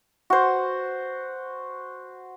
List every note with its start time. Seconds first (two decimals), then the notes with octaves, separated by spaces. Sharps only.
0.30 F#4 C5